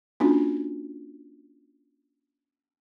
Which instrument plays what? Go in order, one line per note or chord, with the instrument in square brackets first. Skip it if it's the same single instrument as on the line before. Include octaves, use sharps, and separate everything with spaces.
[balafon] A#3 C#4 D4 F4 F#4